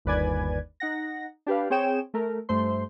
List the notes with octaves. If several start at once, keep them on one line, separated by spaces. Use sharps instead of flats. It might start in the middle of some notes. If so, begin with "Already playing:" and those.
G1 D#2 B4 D5 G#5 G#6
D#4 F#5 A#6
D4 G4 B4 F5
C4 G#4 C#5 G5 E7
A3 A#4
G2 A3 C5 C6